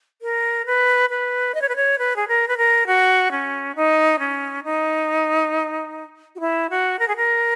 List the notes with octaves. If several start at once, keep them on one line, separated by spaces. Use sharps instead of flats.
A#4
B4
B4
D#5
C#5
B4
C#5
B4
G#4
A#4
B4
A#4
F#4
C#4
D#4
C#4
D#4
F#4
E4
F#4
A#4
G#4
A#4